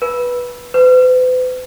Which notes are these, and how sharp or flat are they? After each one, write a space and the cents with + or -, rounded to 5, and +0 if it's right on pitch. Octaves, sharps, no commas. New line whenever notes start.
B4 -15
B4 +45